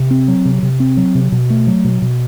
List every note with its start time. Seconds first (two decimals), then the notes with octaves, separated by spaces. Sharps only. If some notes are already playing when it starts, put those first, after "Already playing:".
Already playing: C3
0.11 C4
0.28 F#3
0.45 C3
0.63 C3
0.80 C4
0.97 F#3
1.15 C3
1.32 B2
1.50 A3
1.67 F#3
1.85 B2
2.02 B2